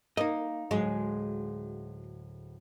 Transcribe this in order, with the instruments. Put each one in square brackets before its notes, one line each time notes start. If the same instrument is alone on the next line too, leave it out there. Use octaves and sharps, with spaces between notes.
[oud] A#3 [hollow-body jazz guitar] D#4 D#5
[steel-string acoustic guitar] D2 A2 F#3 [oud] G#3